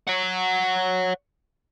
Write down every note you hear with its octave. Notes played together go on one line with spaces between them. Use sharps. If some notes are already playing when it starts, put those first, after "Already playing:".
C#5 F#5